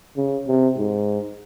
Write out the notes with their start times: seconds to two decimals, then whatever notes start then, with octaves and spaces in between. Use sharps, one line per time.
0.17 C#3
0.47 C3
0.77 G#2